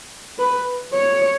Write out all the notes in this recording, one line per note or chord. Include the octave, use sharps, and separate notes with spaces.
B4
C#5